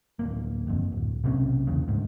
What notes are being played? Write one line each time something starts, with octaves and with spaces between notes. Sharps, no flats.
D1 G#1 A#3
G1 F2
D1
B1 C3 A#3 C#4
E2 C#3
D2 G#2